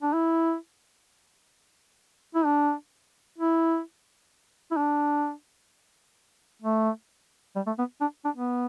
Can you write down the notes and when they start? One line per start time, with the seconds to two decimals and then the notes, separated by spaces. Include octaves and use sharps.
0.02 D4
0.13 E4
2.35 E4
2.45 D4
3.38 E4
4.71 E4
4.77 D4
6.62 A3
7.56 G3
7.67 A3
7.79 B3
8.01 D4
8.25 D4
8.37 B3